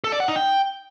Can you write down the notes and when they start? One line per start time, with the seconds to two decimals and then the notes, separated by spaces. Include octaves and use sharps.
0.04 A4
0.12 D5
0.20 F#5
0.28 D#4
0.36 G5